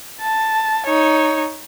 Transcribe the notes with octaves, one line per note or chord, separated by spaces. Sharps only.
A5
D#4 C#5